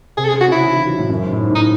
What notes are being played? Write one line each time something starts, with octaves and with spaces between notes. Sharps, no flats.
C3 G#4
A4
G#4
C#3
F#4
C#3 E4
D#3
E3
F#3
A2
F#2
G#2
A2
G#2
A2
D#4